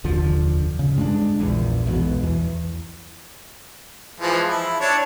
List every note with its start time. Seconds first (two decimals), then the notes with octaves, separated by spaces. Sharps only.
0.04 F1 D#2 D3 F3
0.79 C#3
0.96 G2 G#3 C#4 D4
1.40 A#1 E2
1.86 B1 E2 G#2 B2
2.23 E2
4.20 E3 F3 G#3
4.49 E4
4.80 D4 C#5